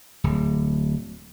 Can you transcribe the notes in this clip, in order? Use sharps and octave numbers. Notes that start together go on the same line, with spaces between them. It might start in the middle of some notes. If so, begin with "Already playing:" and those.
D1